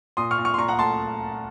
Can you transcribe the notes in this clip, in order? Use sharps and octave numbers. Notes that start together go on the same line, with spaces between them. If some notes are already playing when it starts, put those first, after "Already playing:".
A#2 C6 D#6
C#6 F6
A#2
C#6 F6
C6
A#2 A#5 C#6
F#5 A#5
A3 A5 C6